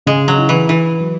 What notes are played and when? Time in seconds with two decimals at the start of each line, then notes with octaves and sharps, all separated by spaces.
0.06 C#3 G#3
0.28 F#3
0.38 E4
0.49 E3
0.68 E3 E4
1.00 F#3